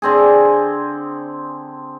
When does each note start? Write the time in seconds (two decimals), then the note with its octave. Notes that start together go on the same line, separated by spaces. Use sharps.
0.02 D3 C4 G#4